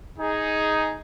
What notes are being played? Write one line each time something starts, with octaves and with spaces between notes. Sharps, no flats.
D#4 G#4